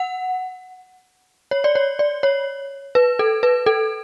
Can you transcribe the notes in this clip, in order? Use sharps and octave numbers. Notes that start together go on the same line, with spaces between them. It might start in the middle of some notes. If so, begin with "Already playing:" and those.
Already playing: F#5
C#5
D5
C#5
D5
C#5
B4
A4
B4
A4